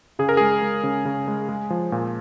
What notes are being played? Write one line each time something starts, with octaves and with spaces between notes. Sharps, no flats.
C#3 G#4
A#4
G#3 G#4
G#3
C#3
C#3
G#3
G#3
F3
A#2